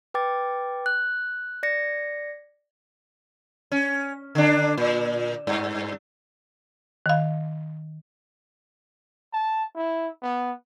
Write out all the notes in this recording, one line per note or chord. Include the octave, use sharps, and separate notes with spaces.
B4 G5 D6 A6
F#6
D5 A#6 C#7
C#4
D3 D4
A#2
G2
D#3 F5
A5
E4
B3